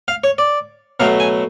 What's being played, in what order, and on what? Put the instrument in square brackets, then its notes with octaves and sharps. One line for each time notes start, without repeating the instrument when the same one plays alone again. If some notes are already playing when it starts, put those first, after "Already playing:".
[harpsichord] F5
C#5
D5
B2 F#3 A3 F5
G#5